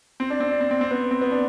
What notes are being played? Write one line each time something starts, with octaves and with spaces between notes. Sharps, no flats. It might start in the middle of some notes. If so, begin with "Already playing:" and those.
C4
D4
C4
D4
C4
C4
C4
B3
C4
B3
D4